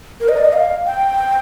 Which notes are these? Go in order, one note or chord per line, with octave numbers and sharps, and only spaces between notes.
A#4
D#5
D5
D#5
F5
G5